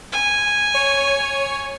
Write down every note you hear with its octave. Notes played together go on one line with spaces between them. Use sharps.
G#5
C#5